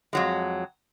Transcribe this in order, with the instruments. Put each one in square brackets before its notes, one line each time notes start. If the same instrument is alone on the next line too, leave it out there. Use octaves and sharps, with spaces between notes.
[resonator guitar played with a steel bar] F2 F#3 G#3